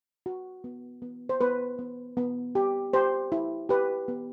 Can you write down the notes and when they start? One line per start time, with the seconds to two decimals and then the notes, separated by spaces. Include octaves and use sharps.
0.26 F#4
0.64 B3
1.02 B3
1.29 C5
1.41 B3 B4
1.79 B3
2.17 B3
2.55 G4
2.93 G4 C5
3.32 E4
3.69 G4 B4
4.08 B3